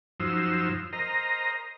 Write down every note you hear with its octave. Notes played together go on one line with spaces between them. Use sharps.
F#2 F3 D#4 C5 E6
A#4 C5 D#5 A#5